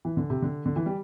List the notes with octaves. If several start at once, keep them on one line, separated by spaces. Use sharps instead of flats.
E3
D3
C3
D3
D3
E3
G3